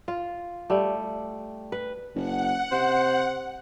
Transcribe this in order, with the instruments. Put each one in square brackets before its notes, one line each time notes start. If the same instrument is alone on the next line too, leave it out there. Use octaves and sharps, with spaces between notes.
[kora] F4
G3 A3
B4
[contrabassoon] F#1 [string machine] F#5
[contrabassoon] C3 [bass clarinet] C5